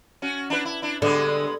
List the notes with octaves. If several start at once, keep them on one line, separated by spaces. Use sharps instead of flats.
C#4 F#4
D4 E4 B4
E4
D4 E4
D3 G3 G#3 B3